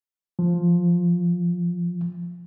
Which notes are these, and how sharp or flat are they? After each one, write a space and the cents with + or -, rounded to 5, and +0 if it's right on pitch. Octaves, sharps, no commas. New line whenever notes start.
F3 +5